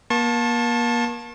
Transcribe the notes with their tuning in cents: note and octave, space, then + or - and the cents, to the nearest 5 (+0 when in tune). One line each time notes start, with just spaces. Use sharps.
A#3 +35 A5 +0 C#6 -40